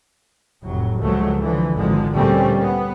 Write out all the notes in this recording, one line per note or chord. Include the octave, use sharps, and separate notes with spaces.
F1 A2 F#3
C#2 F3 F#3 A3
D3 E3 F3
G#1 D3 F3 G#3
D2 A#2 G3 A3 C4 C#4
B3